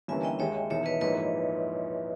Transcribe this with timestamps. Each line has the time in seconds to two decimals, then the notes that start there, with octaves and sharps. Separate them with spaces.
0.08 G1 G2 E3 A#3 C#4 E5 G#5
0.23 D#5 G5
0.39 D#2 D#3 G#3 C#5 E5
0.70 E1 E2 D#3 C#5 E5
0.86 B4 D#5
1.01 A#1 G#2 E3 A#3 B4 D#5